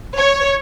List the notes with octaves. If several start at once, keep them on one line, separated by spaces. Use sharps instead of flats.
C#5